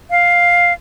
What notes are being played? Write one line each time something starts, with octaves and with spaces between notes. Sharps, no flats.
F5